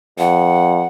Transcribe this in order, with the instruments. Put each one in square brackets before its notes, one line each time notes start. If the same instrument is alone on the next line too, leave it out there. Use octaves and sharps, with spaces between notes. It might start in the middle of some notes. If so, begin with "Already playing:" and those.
[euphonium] F2 [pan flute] F#5